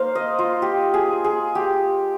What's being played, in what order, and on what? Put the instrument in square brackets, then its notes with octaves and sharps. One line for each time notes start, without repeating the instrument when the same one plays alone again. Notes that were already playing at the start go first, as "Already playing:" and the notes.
Already playing: [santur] A#3 D#4 C5 F5
D#5
F4
G4
G#4
G#4
G4